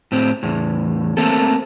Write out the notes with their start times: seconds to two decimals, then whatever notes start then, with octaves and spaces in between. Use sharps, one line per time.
0.12 A2 C4
0.43 E2 A2
1.17 A3 A#3 C4 A4